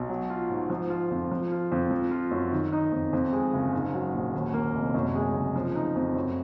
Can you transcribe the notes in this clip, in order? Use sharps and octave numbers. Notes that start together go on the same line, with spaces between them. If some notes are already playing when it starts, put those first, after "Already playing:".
Already playing: B1
F#3
F4
G#2
F3
F4
F2
F3
F4
F2
F3
F4
F#2
D#3
D#4
F2
F2
G#3
F#1
G#2
F#3
A#1
D#2
A#3
F1
F#2
G#3
F#1
F3
D#4
F2
F#2